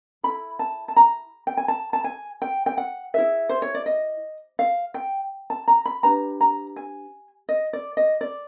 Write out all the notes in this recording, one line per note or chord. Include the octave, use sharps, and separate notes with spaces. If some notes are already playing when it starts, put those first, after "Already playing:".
E4 A4 B5
A5
A5
A#5
G5
G#5
A5
A5
G#5
G5
G5
F#5
E4 G#4 B4 E5
C5
C#5
D5
D#5
F5
G5
A5
A#5
B5
D4 G4 B4 A#5
A#5
G#5
D#5
D5
D#5
D5